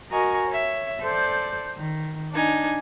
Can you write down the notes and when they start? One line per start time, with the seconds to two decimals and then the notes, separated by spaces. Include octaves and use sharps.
0.11 F#4 A#4 D#5 G#5 C#6
0.48 C#5 E5
1.01 A4 C5 D5 G6
1.77 D#3
2.32 D4 D#4 G#5